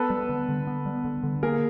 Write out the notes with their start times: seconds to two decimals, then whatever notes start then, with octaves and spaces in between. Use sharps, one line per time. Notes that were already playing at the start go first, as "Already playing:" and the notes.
Already playing: B3 A4 B4
0.10 G3
0.29 D3
0.49 D3
0.67 B3
0.86 G3
1.05 D3
1.24 D3
1.43 A#3 G#4 A#4